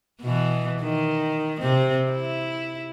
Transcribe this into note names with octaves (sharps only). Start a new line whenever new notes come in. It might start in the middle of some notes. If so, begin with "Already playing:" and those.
B2 E3
D#3
C3 C4
E4